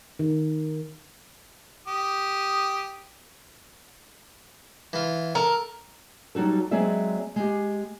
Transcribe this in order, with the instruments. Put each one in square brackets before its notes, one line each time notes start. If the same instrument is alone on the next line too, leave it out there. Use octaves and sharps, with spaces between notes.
[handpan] D#3
[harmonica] G4 D#6
[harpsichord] E3 F4
[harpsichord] A4 [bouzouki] A#4
[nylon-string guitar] F#3 G3 D#4 F#4 A4
F#3 G#3 C4 G#4 D5 E5
G#3 G4